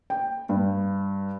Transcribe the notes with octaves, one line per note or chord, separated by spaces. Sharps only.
G5
G2